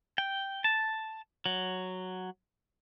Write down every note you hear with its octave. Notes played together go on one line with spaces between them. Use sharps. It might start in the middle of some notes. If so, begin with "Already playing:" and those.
G5
A5
F#3